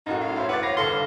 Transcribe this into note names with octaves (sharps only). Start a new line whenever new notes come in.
F#2 A2 D#4 F#4
F5
E4 C5 C#5
B4 F#5 D6 A6
C#5 F5 A#6
G1 A4 F5 C6